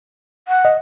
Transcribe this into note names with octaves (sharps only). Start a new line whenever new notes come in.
F#5
D#5